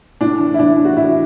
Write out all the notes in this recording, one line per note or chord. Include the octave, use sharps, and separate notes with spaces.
A2 D4
E3
E4
A2 D4
E3
F#4
A2 E4